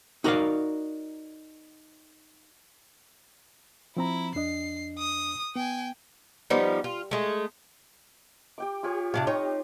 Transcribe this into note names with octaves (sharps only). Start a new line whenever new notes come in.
D#4 F#4 A#4 C#5 D5 F5
F3 C4 E4 A#5
F2 D4 D#5 C7
D#6
B3 G5 G#5
F3 G3 B3 D#4
F4
G#3 A3
G4 G5 D6
F4 G4 C#5
C3 D4 C#5 F5
D#4 C#5 C6